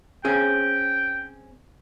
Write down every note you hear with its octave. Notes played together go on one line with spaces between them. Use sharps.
C4 C#4 G#4 G5